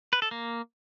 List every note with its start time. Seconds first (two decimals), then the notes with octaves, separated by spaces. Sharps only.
0.13 B4
0.22 A4
0.31 A#3